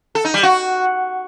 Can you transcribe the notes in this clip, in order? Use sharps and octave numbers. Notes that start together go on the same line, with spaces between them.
A4
D#4
G3
F#4